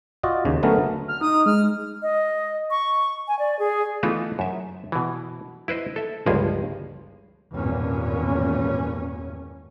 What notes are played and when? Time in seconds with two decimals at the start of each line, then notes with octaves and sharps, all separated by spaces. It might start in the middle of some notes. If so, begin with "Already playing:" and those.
0.23 F4 F#4 D5 D#5
0.45 D#2 C#3
0.63 D3 F#3 A3 B3 C#4 A#4
1.08 F6
1.21 D#4 D#6
1.46 G#3 F6
2.02 D#5
2.70 C#6
3.28 G#5
3.39 D5
3.59 G#4
4.03 E3 A3 B3 D#4 F4 A4
4.39 F#2 E5
4.92 B2 E3
5.68 E4 B4 C5 D#5
5.96 A4 E5
6.26 G1 C#2 G2 F3 A#3 G#4
7.53 G#1 E2 G2 A#2 C#4